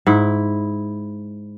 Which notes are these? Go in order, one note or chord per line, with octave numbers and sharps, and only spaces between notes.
G#2 E4